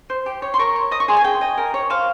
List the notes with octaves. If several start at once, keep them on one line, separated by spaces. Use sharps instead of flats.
C5
G4
C#5
C6
A#4 C#6
C#5
D#5 D#6
C#6
G#4 C6
G#5
G#4 G5
D#5
A#4
C#5
C5 F5